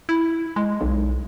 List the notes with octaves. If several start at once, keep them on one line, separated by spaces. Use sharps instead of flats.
E4
G#3
B1